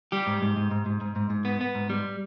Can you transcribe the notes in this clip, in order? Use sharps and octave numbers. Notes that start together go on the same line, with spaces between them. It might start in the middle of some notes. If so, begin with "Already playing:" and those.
G3 G4
G#2
G#2
G#2
G#2
G#2
G#2
G#2
G#2
B3
B3
G#2
G3